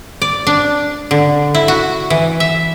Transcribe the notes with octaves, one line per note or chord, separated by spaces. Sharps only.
D5
D4
D3
E4
F#4
E3
E5